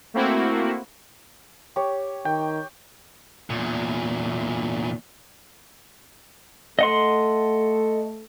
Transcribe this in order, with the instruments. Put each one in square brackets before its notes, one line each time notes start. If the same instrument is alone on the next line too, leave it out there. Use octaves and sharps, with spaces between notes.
[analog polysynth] A3 A#3 C4 E4 F#4
[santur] G4 C#5
[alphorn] D#3 [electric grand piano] G5
[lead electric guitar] E2 A#2
[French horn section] A3 A4 [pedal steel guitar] D#5 F#5 C6